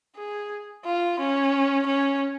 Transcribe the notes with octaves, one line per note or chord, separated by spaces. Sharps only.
G#4
F4
C#4
C#4